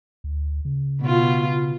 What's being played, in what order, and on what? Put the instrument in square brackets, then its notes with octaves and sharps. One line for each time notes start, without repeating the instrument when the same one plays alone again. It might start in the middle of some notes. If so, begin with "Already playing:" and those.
[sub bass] D2
C#3
[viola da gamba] B2 F4